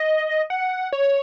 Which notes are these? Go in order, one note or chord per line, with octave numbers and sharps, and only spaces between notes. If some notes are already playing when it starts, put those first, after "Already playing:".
Already playing: D#5
F#5
C#5